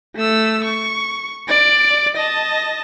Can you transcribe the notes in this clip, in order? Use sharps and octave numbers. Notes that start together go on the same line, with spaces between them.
A3 E6
C#6
D5 D7
D#5 A5